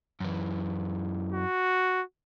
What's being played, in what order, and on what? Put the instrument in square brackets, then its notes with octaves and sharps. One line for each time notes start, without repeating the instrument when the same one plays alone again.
[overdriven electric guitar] F#2 E3
[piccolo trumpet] F#4